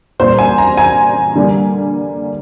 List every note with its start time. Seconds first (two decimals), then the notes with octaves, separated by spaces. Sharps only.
0.19 A#2 G3 A#3 C5
0.39 G#5
0.58 A#5
0.77 G#5
1.35 D3 G3 A#3